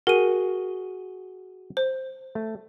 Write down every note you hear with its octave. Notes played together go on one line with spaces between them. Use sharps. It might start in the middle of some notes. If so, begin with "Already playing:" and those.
F#4 G#4 A#4 D#7
C5
A3